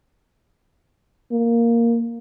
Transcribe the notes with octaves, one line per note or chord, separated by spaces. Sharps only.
A#3